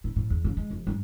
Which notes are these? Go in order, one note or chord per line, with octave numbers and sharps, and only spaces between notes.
A2
A2
E2
C#3
G#3
F1
G2